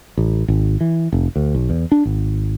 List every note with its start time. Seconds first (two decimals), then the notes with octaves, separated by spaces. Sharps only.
0.17 A1
0.48 G#1
0.81 E3
1.12 F1
1.36 D2
1.55 B1
1.70 E2
1.92 D4
2.05 G#1